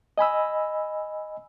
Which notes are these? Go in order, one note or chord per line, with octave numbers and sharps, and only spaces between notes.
D#5 G#5 B5 E6